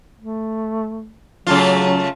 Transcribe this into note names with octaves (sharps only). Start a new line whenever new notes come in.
A3
C#3 F#3 A3 F4